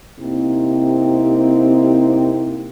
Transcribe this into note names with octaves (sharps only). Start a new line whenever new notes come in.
C3 A#3 C4 D#4 E4 G4